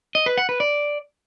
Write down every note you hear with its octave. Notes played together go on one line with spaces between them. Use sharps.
D#5
B4
F#5
B4
D5